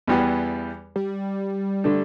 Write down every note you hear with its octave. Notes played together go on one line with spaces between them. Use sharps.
E2 E3 G3 B3 G4
G3
D3 A3 D4